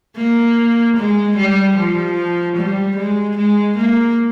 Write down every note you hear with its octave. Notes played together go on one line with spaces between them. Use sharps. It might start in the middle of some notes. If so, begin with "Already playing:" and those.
A#3
G#3
G3
F3
G3
G#3
G#3
A#3